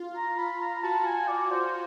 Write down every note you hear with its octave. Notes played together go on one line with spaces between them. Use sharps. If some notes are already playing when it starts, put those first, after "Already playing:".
Already playing: F4
A#5
F4 B5
A#5
F#4 A5
A5
G#5
D5
C5